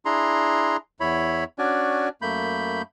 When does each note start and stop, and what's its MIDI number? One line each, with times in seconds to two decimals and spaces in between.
0.05 0.77 62
0.05 0.77 64
0.05 0.77 68
0.05 0.77 82
0.05 0.77 84
1.00 1.44 40
1.00 1.44 64
1.00 1.44 73
1.00 1.44 83
1.58 2.09 61
1.58 2.09 62
1.58 2.09 66
1.58 2.09 74
1.58 2.09 80
2.22 2.82 42
2.22 2.82 57
2.22 2.82 58
2.22 2.82 83
2.22 2.82 91